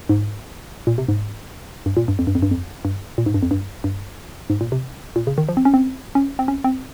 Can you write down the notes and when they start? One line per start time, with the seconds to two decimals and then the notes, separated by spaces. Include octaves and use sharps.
0.09 G#2
0.87 A#2
0.98 C3
1.08 G#2
1.86 G2
1.97 A#2
2.08 G2
2.19 F2
2.27 G2
2.35 F2
2.42 G2
2.51 F2
2.85 G2
3.18 A#2
3.26 G#2
3.34 G2
3.43 F2
3.51 G2
3.84 G2
4.50 G#2
4.61 A#2
4.72 C3
5.16 A#2
5.27 C#3
5.38 D#3
5.49 F3
5.57 C4
5.65 C#4
5.74 C4
6.15 C#4
6.39 C4
6.48 C#4
6.64 C4